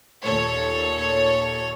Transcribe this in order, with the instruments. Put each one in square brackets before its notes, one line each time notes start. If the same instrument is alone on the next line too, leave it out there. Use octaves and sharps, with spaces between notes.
[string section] D#2 A#2 A4 C#5